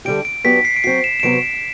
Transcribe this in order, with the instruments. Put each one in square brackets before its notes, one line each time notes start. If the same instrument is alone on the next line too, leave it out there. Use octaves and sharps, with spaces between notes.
[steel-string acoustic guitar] D3 G3 D4 G4 [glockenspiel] D7
[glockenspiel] D7
[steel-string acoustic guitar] F#3 B3 D4 G4 [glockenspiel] B6
[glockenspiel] C7
D7
[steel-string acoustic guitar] F#3 C4 F#4 [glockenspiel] C7
[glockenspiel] E7
E7
[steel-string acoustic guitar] C3 F#3 B3 F#4 [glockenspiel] D7